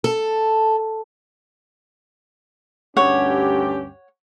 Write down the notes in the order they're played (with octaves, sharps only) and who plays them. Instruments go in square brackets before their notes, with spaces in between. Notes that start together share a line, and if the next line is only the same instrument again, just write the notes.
[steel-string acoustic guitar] A4
[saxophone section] D2 G2 G4 [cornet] C#4 [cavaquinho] C#5 F#5